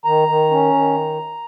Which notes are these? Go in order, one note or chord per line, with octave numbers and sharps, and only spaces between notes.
D#3 A#5
D#3
C#4
D#3